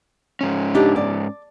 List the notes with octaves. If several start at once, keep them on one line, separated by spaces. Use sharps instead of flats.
G#2 C#4
D4 D#4 G4
D5